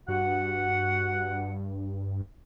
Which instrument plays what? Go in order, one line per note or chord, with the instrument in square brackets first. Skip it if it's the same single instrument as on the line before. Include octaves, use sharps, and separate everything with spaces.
[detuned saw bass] G2 [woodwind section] F#4 F#5